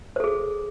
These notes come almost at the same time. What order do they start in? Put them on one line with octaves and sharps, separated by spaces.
C5 A4 G#4